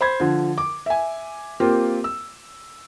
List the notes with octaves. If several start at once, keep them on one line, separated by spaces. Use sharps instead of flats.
C5 B5 G#6
D3 F3
D6
E5 G#5
A#3 C4 F4 G4
E6